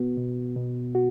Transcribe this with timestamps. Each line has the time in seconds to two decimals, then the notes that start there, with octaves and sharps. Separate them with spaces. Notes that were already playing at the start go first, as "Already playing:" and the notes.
Already playing: B2 B3 F#4
0.17 B2
0.56 B2
0.95 F#4